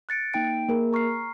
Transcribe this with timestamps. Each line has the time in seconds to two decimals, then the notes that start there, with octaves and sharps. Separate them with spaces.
0.09 F#6 A6 C#7 D7
0.34 A#3 D#4 G5 D7
0.69 A#3 G#4 A#4
0.93 A#5 C#6 F6 C7